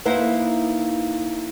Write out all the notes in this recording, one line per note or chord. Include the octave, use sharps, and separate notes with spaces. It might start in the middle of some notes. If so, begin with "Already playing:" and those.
A#3 D#4 E4 B4 C5 F#5